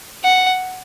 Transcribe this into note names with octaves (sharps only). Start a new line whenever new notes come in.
F#5